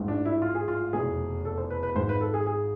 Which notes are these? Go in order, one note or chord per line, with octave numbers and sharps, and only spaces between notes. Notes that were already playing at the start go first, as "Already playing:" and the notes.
Already playing: A1 G#2 G#3
D4
E4
F4
G#4
F4
F1 E2 B2 G#3 G#4
A4
C5
B4
B4
G#1 G#2 G#3 C5
B4
A4
G#4
G#4